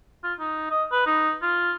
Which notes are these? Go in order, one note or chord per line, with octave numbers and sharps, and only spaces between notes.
F4
D#4
D#5
B4
D#4
F4